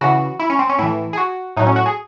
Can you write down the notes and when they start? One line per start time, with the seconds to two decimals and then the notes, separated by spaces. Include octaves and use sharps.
0.01 C#3 E3 F#4
0.40 E4
0.50 C#4
0.59 C4
0.69 C#4
0.78 A2 E3 E4
1.13 G#4
1.17 F#4
1.56 A2 F#3 D#4
1.67 C#4
1.76 F#4
1.86 G#4